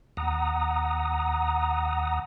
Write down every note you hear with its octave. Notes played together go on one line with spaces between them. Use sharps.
D#2 F#5 A#5 D#6